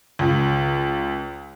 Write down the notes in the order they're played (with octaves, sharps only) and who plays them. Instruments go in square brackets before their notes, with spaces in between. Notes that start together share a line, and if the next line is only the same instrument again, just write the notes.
[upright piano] C#2